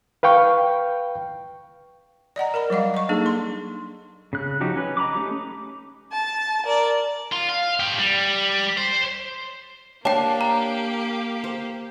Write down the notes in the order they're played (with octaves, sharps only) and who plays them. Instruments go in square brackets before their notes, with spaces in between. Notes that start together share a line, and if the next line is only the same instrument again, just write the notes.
[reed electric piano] B4 F5 G5 C#6
[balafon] D5 D#5 F#5 A#5
A#4 D5 B5
F#3 G3 D#5 F5
D#5 C#6
A#3 D4 D#4 G#4 A4
C6
[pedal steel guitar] C#3 F#6
F3 F#3 D#4 F#4 G4
C#4 B4
D#5 A#5 B5 D6
A3 C#4 D#4 G4 D6
[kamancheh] A5
A#4 D5
[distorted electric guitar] F4
F5
A2 G4
G3
C5
[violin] A#3 G4 [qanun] D4 [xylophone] C#5 G5 [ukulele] A5
[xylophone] A#5
[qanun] C5